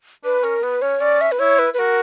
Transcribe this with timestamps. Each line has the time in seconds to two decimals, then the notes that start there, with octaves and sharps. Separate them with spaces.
0.24 D4 B4
0.43 C#4 A#4
0.63 B3 B4
0.82 C#4 C#5
1.01 C#4 D5
1.21 E5
1.32 B4
1.39 E4 C#5
1.59 B4
1.74 B4
1.79 F#4 A#4